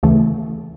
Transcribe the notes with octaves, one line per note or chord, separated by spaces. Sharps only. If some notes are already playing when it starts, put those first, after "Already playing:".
D2 C#3 E3 A3